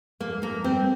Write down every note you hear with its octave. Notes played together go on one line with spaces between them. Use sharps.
F2 A#3
F2 A#3
G3 C4